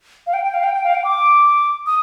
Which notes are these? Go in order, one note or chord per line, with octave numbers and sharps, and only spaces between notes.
F5
G5
G5
F5
G5
G5
F5
G5
D6
D#6